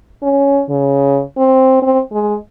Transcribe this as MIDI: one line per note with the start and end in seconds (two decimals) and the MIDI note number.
0.22 0.61 61
0.69 1.21 49
1.38 1.81 60
1.82 2.00 60
2.12 2.36 56